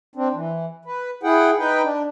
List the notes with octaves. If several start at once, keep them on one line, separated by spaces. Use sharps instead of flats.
C4 D4
E3
B4
E4 G#4 F#5 G5
D#4 B4 G5
D4